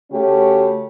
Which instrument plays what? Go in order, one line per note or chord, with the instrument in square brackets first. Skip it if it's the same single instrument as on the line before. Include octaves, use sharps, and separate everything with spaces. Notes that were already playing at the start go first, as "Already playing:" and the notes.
[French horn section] C#3 A3 C#4 F#4 G4